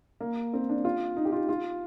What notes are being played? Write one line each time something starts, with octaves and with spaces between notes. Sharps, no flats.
A#3
C4
D4
F4
D#4
G4
F4
F4